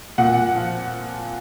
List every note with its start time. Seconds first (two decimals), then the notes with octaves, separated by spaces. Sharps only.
0.18 A#2 F#5
0.55 F3